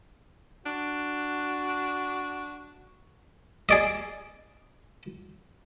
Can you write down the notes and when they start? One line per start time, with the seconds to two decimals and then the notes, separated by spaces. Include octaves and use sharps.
0.66 D4 F#4
3.69 G#4 D5 D#5